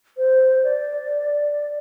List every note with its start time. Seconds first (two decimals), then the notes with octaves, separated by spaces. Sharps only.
0.17 C5
0.63 D5